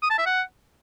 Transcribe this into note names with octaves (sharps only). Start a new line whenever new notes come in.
D#6
A5
E5
F#5